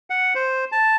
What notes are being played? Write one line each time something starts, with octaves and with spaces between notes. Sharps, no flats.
F#5
C5
A5